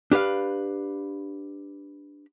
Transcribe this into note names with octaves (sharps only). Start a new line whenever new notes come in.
D4 G4 B4 F5